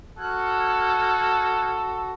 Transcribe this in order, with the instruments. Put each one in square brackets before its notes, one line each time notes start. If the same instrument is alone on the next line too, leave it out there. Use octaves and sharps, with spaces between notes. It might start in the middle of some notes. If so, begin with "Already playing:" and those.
[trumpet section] F#4 A4 [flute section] F6 F#6 G#6